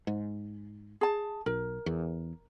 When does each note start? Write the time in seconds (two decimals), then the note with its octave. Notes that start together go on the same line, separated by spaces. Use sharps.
0.07 G#2
1.01 G#4 A5
1.46 B1 A#4
1.86 E2